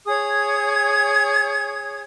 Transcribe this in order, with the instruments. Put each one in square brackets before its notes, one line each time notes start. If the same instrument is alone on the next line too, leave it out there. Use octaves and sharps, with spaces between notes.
[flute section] G#4 C#5 D#6 G#6